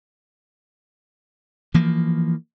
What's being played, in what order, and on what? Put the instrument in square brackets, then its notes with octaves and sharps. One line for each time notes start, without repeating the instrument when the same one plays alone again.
[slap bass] E3 F3 A#3